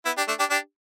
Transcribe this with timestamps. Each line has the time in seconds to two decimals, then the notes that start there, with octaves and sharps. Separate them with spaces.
0.06 B3 E4
0.18 D4 G4
0.28 A3 D4
0.39 D4 G4
0.50 D4 G4